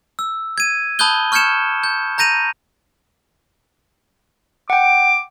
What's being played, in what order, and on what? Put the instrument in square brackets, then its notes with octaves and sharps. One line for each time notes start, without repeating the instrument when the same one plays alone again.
[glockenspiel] E6
G#6 D#7
A5 B5 D#6 F#6 G6 G7
C#6 F6 G6 G#6 C#7 E7
G6
A#5 G6 A#6 D#7 F7
[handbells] F#5 G5 [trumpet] D6